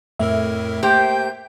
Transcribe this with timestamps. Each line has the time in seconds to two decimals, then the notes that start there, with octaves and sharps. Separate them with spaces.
0.19 F2 A2 A3 A#4 E5
0.83 A#3 G4 C5 G5 G6